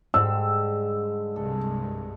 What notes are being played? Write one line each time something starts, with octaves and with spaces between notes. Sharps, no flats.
G#2 D3 G3 G#3 E6
C2 G2 G#3 A4